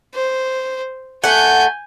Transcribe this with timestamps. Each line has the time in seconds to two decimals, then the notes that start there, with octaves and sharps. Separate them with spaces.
0.15 C5
1.24 A3 F#5 G#5 G6